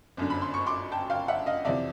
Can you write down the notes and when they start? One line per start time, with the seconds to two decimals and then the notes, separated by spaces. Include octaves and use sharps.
0.17 G1 F#2 D3
0.30 B5
0.42 C6
0.54 C#6
0.66 C6 D6
0.92 G5 A5
1.10 F5 G5
1.28 E5 F#5
1.46 D#5 F5
1.65 F2 C3 E3 D5 E5